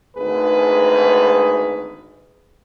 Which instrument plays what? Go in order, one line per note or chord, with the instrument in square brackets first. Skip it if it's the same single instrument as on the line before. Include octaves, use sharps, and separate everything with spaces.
[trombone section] G#1 D2 G#2 G#4 B4